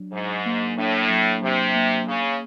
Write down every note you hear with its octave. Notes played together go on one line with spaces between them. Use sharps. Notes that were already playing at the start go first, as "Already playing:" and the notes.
Already playing: F#3 D4
G#2 F#3
A#3
A2 D4
F#3
C3 F#3
A#3
C#3 A#3